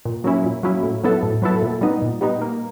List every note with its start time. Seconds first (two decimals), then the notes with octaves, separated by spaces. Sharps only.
0.05 A#2
0.24 F#3 A#3 C#4 E4
0.44 A#2
0.63 F#3 A#3 C#4 E4
0.83 A2
1.04 F#3 B3 E4 A4
1.23 A2
1.42 F#3 B3 E4 A4
1.62 A#2
1.81 G3 B3 D#4
2.02 A#2
2.21 G3 B3 D#4
2.42 A#3